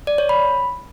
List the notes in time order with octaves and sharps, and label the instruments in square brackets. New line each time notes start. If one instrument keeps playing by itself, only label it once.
[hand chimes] D5
C#5
B5